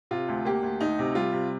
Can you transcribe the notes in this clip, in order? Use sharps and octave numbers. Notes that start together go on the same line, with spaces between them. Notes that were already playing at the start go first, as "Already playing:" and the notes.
C3 F4
D2
A#3 G4
D2
D2 D#4
C3
G3 F4
C3